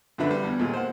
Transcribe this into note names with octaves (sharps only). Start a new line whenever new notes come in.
F#2 D3 F3 D4 B4 E5
G3
E2
D#2 A#2 G#3
C5 F#5